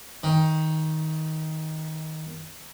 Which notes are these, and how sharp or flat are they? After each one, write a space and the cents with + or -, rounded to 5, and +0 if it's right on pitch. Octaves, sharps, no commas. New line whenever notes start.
D#3 +15